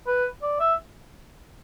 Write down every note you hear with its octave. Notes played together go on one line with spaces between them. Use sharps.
B4
D5
E5